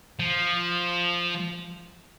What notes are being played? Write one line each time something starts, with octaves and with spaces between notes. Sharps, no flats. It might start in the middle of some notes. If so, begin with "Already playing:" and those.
F3